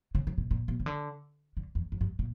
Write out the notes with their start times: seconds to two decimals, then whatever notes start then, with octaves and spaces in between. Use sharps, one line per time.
0.15 C#3
0.27 C#3
0.38 B2
0.51 A#2
0.68 B2
0.80 C#3
0.86 D3
1.57 D3
1.75 E2
1.92 F#2
2.01 G2
2.19 A#2